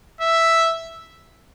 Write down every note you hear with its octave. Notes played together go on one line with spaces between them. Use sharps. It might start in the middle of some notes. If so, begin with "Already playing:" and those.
E5